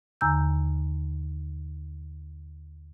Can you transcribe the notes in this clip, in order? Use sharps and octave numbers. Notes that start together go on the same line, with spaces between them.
D#2 D3 G#5 A#5 E6 G6